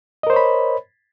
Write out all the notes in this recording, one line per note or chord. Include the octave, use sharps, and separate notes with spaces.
A#4 C5 C#5 D#5 B5